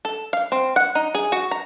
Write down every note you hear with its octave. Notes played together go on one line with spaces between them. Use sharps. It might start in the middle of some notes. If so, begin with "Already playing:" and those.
A4
F5
C4
F#5
D#4
G#4
F#4
A#5